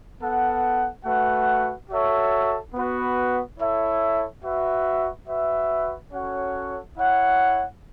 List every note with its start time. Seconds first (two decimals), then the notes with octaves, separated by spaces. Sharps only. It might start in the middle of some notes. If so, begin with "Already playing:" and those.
0.21 B3 A4 F#5
1.05 A3 F#4 B4 F#5
1.89 F#4 A4 C#5 E5
2.74 B3 F#4 B4
3.59 E4 A4 C#5 E5
4.43 F#4 B4 E5
5.27 F#4 B4 E5
6.11 C#4 F#4 A4 C#5 F#5
6.96 E4 C#5 F#5